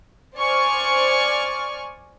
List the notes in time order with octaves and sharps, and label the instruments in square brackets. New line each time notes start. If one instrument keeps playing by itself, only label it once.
[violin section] C5 D5 G#5 C#6 F6